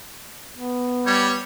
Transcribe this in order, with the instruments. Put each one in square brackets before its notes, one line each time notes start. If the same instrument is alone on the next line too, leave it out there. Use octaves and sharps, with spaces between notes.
[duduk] B3
[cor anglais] G3 [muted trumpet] C#5